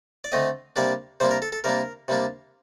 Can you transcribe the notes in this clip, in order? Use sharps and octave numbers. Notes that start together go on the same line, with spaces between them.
D5
D3 A3 C4 D#5
C3 G3 A#3 D4 D5
C3 G3 A#3 D4 C5
A#4
A4
A4
C3 G3 A#3 D4 A#4
C3 G3 A#3 D4